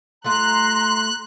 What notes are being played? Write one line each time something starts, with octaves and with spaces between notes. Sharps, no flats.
G3 A3 F4 A#5 C6 F#6